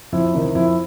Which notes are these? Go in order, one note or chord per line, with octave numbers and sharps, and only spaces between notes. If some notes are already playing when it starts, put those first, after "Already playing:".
F2 E4 E5
C3 D#3
F2 E4 E5